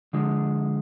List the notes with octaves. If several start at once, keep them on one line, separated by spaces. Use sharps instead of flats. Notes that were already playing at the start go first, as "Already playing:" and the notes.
D3 F3 G#3